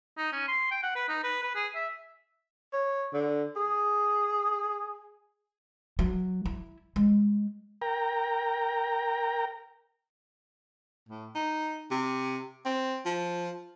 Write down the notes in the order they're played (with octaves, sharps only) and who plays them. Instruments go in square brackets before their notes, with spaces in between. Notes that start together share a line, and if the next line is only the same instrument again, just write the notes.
[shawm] D#4
C#4
C6
G5
F#5
B4
D#4
B4
B4
G#4
E5
[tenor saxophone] C#5
D3
G#4
[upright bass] F#3
E4
G#3
[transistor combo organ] A#4 G5 A#5
[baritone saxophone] A2
D#4
C3
C4
F3